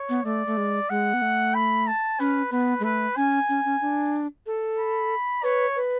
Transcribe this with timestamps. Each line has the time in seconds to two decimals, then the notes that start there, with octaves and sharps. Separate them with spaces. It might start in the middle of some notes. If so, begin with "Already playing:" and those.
Already playing: C#5
0.09 B3
0.24 A3 D5
0.47 A3
0.57 G#3
0.90 G#3 F#5
1.14 B3
1.22 A3
1.54 B5
1.87 A5
2.19 C#4 B4
2.51 B3 B4
2.80 G#3
2.84 A3 B4
3.16 C#4 G#5
3.49 C#4
3.65 C#4
3.81 D4
4.46 A4
4.79 B5
5.43 B4 C#5
5.76 B4